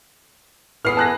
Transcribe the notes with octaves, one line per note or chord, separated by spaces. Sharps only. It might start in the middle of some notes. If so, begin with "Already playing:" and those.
E3 B3 G#4 F6 C7
A5 F#6 A#6